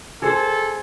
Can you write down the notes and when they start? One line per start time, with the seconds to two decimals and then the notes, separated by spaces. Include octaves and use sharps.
0.22 G#4 A4 C5